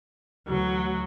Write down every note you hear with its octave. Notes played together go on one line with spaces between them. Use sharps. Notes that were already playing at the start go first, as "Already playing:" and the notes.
D2 E3 F#3